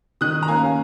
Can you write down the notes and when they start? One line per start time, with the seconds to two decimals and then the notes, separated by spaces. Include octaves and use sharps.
0.21 D#3 D#6 F#6
0.43 A#5
0.48 A#3 C#4 F5 G#5